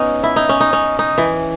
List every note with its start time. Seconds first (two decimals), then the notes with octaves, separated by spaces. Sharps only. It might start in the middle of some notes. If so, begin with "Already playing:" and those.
Already playing: B3 C#4 D#4
0.23 E4
0.36 D#4
0.49 C#4
0.60 D#4
0.73 C#4
0.99 D#4
1.18 E3